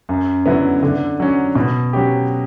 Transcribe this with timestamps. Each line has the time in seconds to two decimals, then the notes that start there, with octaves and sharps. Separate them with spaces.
0.09 F#2
0.46 D3 F#3 B3 E4
0.83 D3
1.20 F#3 C#4
1.55 B2
1.93 F#3 C#4 G4